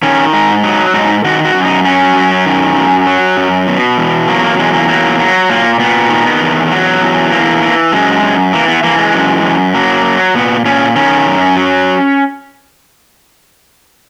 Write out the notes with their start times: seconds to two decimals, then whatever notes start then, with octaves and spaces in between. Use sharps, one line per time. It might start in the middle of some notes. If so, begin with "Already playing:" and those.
0.03 D#3 C#4
0.33 G#2 D#4
0.63 F#3 D#4
0.94 G#2 D#4
1.24 D#3 F#4
1.45 F#4
1.55 F#2
1.64 D#4
1.85 F#3 C#4
2.16 F#2
2.46 D#3
2.76 F#2
3.07 F#3
3.37 F#2
3.67 B2
3.98 E2
4.28 F#3 A#3
4.43 A#3
4.58 E2 G#3
4.73 A#3
4.88 F#3 A#3
5.19 F#3
5.50 A#2 A#3
5.80 A#2 B3
6.10 D#3
6.41 E2
6.71 F#3
7.01 E2
7.32 E3 A#3
7.62 E3
7.92 F#2 G#3
8.22 F#2
8.53 E3 A#3
8.68 B3
8.83 E3 A#3
8.98 G#3
9.14 F#2
9.44 F#2
9.74 F#3 A#3
10.05 F#3
10.35 A#2 B3
10.65 A#2 C#4
10.96 D#3 C#4
11.26 F#2
11.57 F#3